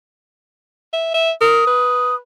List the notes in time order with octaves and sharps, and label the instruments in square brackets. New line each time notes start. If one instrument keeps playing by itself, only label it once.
[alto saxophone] E5
E5
[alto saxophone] A#4 [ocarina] D#6
[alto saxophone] B4